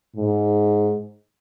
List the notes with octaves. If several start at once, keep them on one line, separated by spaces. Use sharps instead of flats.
G#2